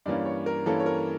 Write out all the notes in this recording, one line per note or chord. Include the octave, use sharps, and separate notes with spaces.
G2 E3 A#3 C#4 D5
C#5
A#4
G2 E3 A#3 C#4 A4
C#5
A#4